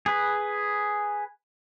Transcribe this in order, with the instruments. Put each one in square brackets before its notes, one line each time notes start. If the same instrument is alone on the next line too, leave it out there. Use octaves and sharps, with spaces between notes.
[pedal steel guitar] G#4 B4